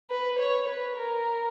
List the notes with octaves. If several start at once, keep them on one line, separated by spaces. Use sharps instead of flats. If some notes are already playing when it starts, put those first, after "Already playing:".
B4
C#5
B4
A#4